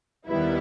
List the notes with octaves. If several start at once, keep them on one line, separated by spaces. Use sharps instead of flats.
D#2 D#3 G3 B3 E4